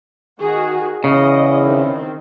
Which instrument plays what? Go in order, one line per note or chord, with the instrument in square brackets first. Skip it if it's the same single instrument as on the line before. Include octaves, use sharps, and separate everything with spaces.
[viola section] D#3 F#4 G#4
[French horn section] E2 E4 [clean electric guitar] C#3 [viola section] D#5
[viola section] D#3 C4